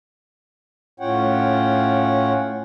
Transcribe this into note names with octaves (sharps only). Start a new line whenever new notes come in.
A2 C#4 F4 C#5 F#5 G5